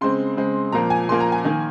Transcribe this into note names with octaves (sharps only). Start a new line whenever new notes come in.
C#3 G#3 C4 C6
C#3 G#3 C4
A#2 F3 A#3 A#5
G#5
A#2 F3 A#3 C6
A#5
G#5
D#3 A#3